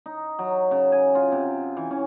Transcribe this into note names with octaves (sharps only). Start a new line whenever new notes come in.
D#4
F#3
C#3
G#5
F4
C3
E3
C#4